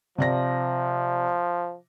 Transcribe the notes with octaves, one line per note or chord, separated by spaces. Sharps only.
C3 F3 D5 A#6